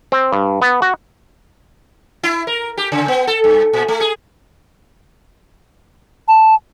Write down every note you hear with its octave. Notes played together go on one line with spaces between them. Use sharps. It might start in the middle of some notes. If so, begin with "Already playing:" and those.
C4
G2
B3
F#4
E4
A#4
G4
C#3
B3
A4
G2
A#2
A3
G#4
A5